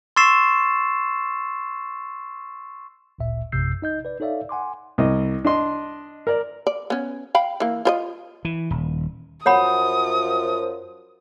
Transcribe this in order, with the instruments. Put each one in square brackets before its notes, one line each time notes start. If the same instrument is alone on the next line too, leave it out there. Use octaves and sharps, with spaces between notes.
[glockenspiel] C6 C#6 E6 A6 C7 E7
[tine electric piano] G1 D2 A#2 E5
A#1 F#2 C3 E6 G6 C7
D#4 D#5 G6
B4 D5
D#4 A4 C#5 D5 E5 F5
F#5 G#5 C6 D6
[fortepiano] C2 D#5
D4 D#5 C6
A#4 D5
[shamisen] D5
B3 C#4
F5 G5 B5
E3 A#3
F4 C5 D#5
[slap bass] E3
D#1
[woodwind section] F#2 F3 [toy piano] C#5 F#5 B5 [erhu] D#6